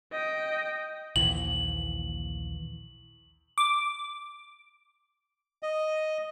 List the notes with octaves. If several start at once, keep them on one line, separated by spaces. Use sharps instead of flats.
D#5 G5
A#1 D#2 E3 F#7
D6
D#5